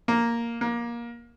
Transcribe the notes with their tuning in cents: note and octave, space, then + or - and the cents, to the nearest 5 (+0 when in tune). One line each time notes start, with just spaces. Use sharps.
A#3 +0
A#3 +20